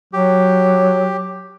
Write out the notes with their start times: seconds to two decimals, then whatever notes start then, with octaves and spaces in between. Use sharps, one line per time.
0.13 F#3 G4